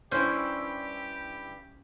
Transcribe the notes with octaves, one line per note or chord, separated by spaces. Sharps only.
G2 C#4 E4 G4 C5